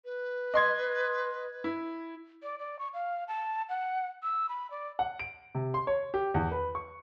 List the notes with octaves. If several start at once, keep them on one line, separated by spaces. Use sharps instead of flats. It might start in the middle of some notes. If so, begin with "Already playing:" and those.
B4
D#5 C6 G#6
E4
D5
D5
C#6
F5
A5
F#5
E6
B5
D5
F#5
D7
C3
C6
C#5
G4
E2
B4
C#6